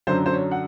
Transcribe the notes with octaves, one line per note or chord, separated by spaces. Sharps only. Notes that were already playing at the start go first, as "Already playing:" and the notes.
F#2 D3 F#3 C5
C5
C#5
F#5